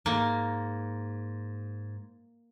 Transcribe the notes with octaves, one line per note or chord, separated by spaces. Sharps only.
G#2 A#3